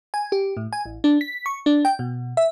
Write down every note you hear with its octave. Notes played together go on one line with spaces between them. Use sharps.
G#5
G4
A2
G#5
A1
D4
B6
C#6
D4
G5
B2
E5